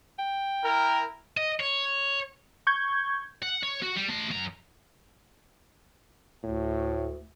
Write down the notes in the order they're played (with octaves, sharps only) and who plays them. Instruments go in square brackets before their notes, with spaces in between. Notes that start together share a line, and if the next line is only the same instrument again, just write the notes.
[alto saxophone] G5
[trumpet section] E4 A#4
[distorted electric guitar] D#5
C#5
[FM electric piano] C#6 G6 G#6
[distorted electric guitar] F#5
C#5
F#4
G3
A3 C6
F#2 A#5
[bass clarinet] D2 [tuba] A2